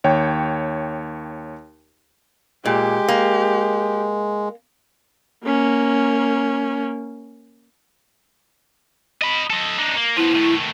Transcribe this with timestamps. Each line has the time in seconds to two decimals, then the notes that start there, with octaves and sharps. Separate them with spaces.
0.04 D#2 C#5 G5
2.65 A#2 G#3 G4
3.08 A#3
5.44 A#3 C#4
9.22 D#5 B5
9.50 A4 D#5
9.78 D4 D#4
9.96 A#3
10.17 F3 B3 E4
10.36 D#3 A3